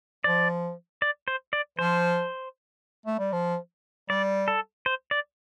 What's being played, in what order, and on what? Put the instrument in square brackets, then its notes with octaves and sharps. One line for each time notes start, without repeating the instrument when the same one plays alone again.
[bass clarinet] F3 [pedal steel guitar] D5
[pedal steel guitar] D5
C5
D5
[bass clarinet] F3 [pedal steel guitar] C5
[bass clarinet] A3
G3
F3
[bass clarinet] G3 [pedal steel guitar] D5
[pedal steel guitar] A4
C5
D5